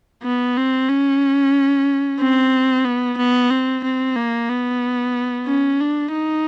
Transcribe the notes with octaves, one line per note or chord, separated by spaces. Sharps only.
B3
C4
C#4
C4
B3
B3
C4
C4
A#3
B3
C#4
D4
D#4